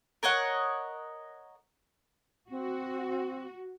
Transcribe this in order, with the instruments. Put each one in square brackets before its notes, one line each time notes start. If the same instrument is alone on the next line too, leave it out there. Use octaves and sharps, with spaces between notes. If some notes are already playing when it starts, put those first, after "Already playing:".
[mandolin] A#4 C#5 D#5 F#5
[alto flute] C4 [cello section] F#4